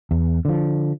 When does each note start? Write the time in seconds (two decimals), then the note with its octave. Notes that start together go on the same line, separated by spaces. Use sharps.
0.11 E2
0.45 D3 F3